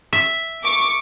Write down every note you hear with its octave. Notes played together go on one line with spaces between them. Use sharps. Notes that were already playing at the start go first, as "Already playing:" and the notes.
E5
C#6 D6 D7